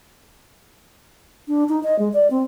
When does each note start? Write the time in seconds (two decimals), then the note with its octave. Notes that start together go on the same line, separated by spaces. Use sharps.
1.48 D4
1.69 D#4
1.83 D#5
1.99 G#3
2.13 D5
2.31 C4